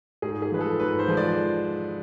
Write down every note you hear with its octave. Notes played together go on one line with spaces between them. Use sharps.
G#2 G#4
G#4
F3 G#3 B4
A4
G#2 B4
C5
F3 G#3
D5